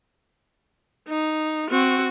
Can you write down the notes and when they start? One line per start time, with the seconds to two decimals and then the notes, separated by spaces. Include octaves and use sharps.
1.09 D#4
1.70 C4 F#4